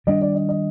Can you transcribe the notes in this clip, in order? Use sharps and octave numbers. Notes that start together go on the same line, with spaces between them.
D#3 G3 D4 D#5
D5
D#5
D#5